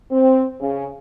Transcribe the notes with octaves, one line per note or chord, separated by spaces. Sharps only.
C4
C#3